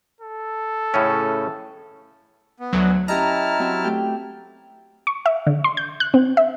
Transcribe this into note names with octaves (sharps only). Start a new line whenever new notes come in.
A4
A2 C#3 C#4
B3
D2 F#3 F#6
C#4 E4 G4 D#5 A5 A#5 F6
F#3 C4 E5
A3 G4 G5
C#6
E5
D3
C6
G6
F#6
C4
E5